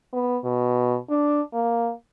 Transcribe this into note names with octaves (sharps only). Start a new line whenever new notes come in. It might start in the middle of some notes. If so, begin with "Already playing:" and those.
B3
B2
D4
A#3